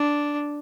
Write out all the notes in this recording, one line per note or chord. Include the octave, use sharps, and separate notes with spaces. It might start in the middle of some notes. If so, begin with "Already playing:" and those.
Already playing: D4